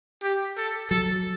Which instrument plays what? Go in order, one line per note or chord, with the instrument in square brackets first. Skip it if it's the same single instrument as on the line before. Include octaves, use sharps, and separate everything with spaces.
[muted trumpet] G4
A4
[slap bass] F#3 [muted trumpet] A4